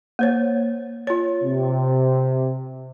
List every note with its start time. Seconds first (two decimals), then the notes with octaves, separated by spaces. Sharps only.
0.19 A#3 C5 C#5
1.07 F4 C#5
1.44 C3